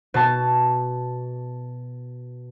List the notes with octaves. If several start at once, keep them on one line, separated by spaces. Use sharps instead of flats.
B2 A5